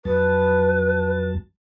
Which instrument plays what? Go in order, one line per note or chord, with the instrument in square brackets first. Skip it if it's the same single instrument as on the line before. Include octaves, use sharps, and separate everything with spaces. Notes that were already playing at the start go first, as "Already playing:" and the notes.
[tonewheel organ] F2 F#3 A5 [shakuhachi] B4